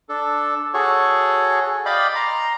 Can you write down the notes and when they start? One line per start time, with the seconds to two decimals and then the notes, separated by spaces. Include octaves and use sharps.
0.09 D4 A4
0.74 F#4 G#4 A4 C#5
1.86 D5 D#5 F5 G5 B5 D6
2.15 A#5 C6